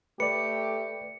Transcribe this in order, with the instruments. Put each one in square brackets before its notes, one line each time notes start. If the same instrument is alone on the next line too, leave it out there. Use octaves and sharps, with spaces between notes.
[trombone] A3 [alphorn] G4 [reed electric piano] B4 D5 [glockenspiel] C#7